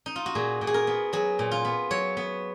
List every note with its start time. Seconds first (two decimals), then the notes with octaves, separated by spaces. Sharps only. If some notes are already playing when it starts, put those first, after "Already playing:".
0.06 D#4
0.16 F4
0.26 F#4
0.35 A#2 G#4
0.61 A#2
0.67 G#4
0.74 A#4
0.87 B3
1.13 F#3 G#4
1.39 A#2
1.51 F4
1.65 B3
1.91 F#3 C#5
2.17 B3